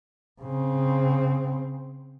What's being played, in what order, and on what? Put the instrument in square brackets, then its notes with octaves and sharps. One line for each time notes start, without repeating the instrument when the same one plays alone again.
[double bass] C#3 C4